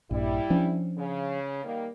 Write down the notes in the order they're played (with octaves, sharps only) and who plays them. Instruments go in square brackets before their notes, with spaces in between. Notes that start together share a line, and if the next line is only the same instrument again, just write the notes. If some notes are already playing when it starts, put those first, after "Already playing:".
[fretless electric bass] A#1 G2 [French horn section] G3 E4
[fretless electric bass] F3 C#4 D4
[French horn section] C#3
D#3 G3 A#3